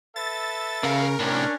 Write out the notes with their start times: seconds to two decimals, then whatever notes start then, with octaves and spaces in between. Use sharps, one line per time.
0.16 A4 B4 E5 A6
0.83 E2 C#3 A#4 F5
1.19 A2 C3 C#4 D4